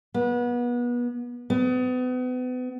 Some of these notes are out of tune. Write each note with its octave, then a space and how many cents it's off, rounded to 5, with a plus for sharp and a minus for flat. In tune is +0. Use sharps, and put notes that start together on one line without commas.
B3 -30
B3 +35